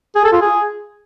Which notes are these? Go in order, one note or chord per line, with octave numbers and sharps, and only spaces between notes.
G#4
A4
F4
G#4